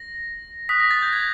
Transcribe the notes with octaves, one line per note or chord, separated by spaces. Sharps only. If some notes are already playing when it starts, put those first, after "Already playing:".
Already playing: A#6
D#6 F#6 B6
A#6
A6
G6
G#6